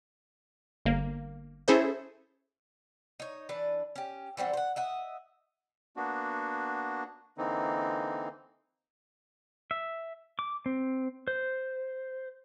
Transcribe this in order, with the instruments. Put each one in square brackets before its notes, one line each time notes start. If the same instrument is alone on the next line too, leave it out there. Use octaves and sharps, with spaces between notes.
[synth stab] G1 A#3
C#4 E4 G#4 A4 C5 E5
[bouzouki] D#4 C#5
E3 D4 B4
C#4 G4
E3 G3 C4 F#4
C5 F#5
D#5 E5 F#5
[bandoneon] A#3 B3 D4 F#4
D3 E3 A#3 C4 D#4
[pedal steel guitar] E5
D6
C4
C5